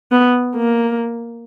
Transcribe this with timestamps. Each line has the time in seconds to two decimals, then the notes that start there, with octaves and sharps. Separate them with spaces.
0.12 B3
0.56 A#3